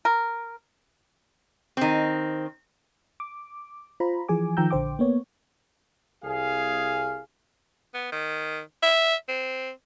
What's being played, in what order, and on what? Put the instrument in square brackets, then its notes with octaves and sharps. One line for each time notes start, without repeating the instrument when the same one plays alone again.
[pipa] A#4
[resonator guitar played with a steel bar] D#3 C4
[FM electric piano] D6
F4 C5 A#5 B5
E3 F3 G#4 G#5 D6
D#3 F3 G5 A#5 E6 G6
A#1 D3 C5 G5 D6
A#3 B3 C#5
[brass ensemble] C2 G#4 F5
[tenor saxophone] B3
D#3
E5
C4